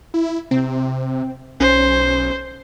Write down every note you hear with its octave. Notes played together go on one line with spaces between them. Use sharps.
E4
C3 C4
B1 C#4 C5